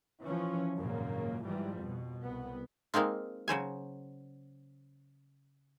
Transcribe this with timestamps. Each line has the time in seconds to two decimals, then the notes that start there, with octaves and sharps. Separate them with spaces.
0.24 E3 F3 C#4
0.77 G#1 F#2 A#2 C#3 A#3
1.46 G#2 E3 F3 G3
1.81 F2 B2
2.25 C2 B3
2.94 G#3 A#3 C4 D#4 F4
3.48 C#3 F#3 C5 G#5